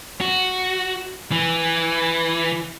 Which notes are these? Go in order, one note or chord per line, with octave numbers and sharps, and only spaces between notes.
F#4
E3